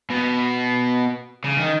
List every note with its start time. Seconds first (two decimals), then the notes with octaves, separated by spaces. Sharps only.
0.10 B2
1.44 C#3
1.57 D#3